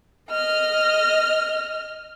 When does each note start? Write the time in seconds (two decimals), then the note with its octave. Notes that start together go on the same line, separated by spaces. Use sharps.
0.30 D#5 F6